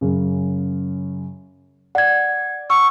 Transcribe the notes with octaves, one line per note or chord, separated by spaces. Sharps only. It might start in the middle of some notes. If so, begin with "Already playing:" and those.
F#2 C#3
D5 F#5 G#6
F#5 C#6 E6